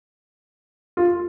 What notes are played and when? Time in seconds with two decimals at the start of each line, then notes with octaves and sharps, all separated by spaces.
0.97 F4